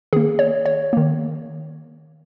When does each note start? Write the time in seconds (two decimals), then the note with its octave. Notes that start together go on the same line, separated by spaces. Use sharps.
0.13 D#3 A#3 G#4
0.39 C#5
0.66 C#5
0.93 D#3 A#3